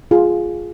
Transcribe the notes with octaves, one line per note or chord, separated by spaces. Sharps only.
F4 G#4